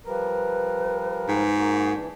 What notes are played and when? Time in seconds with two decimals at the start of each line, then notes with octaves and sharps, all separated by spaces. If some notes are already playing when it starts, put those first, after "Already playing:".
0.05 F3 G3 A#4 B4
1.28 G#2
1.57 A#3 F#4
1.94 E3 D4